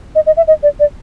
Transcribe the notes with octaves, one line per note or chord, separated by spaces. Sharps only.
D#5
D#5
E5
D#5
D5
D5